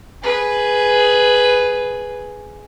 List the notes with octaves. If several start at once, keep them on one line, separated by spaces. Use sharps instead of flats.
G#4 B4